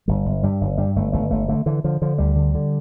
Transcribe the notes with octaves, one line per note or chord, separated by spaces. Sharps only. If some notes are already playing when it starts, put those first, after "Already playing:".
G1 G3
G1
G2 G3
G1
G2 G3
G1 A3
G1 A3
G1 A3
D3 A3
D3 E3
D3 F3
D3 F3
D2 G3
D3
D3